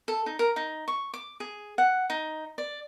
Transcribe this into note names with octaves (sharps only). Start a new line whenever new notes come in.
A4
D#4
A#4
D#4
C#6
D6
G#4
F#5
D#4
D5